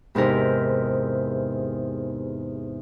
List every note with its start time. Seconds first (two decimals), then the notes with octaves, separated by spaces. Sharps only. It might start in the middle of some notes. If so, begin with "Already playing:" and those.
0.15 E2 G#2 C3 A#4